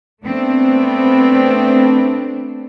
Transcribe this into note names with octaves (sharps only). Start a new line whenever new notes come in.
A3 B3 C4 D4